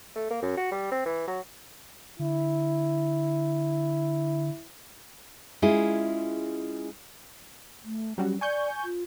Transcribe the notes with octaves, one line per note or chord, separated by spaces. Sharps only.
A3
A#3
F#2
F#4
G3
C4
E3
F#3
D3 E4
G#3 C#4 E4 F4 G#4
A3
F#3 G3 C#4 F#4
D5 G#5 C#6 G6
F4